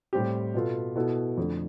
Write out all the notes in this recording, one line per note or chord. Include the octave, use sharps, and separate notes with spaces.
A2 G3 C4 G4
B2 B3 F4 A4
B2 B3 E4 A4
F2 D3 A3